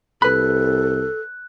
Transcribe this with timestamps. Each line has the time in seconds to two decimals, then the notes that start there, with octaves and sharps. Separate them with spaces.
0.22 C2 A4 B4 B5 F#6